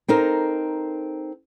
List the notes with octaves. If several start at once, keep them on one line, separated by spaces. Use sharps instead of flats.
C4 D#4 A4 A#4